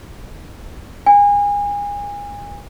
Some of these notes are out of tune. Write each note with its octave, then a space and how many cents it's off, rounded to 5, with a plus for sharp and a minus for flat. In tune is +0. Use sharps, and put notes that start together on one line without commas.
G#5 -30